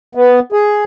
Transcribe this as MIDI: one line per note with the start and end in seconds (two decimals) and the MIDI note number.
0.15 0.40 59
0.52 0.84 68